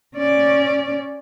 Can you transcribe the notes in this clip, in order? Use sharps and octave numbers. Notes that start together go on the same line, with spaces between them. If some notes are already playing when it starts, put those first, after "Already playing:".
C#4 D5